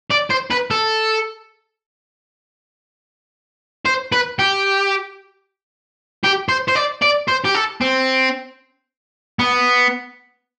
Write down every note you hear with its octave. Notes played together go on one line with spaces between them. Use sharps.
D5
C5
B4
A4
C5
B4
G4
G4
C5
C5
D5
D5
C5
G4
A4
C4
B3